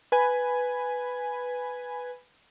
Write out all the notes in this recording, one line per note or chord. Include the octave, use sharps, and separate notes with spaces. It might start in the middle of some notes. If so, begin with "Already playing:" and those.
B4 G#5